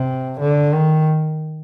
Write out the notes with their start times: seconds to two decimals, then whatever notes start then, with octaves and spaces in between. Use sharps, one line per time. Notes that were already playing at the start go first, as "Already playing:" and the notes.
Already playing: C3
0.40 D3
0.74 D#3